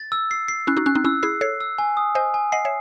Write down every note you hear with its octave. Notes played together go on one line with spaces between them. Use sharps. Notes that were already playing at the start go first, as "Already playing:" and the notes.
Already playing: A6
E6
C7
C7
C#4 E4 F#6
D#4 F#4
C#4 F#6
C4 D#4
C#4 E4 E6
E4 G#4 C7
A4 C#5 C7
E6
G#5
D#6
C5 D#5 G#5
G#5
D#5 F#5 C7
C#5 E5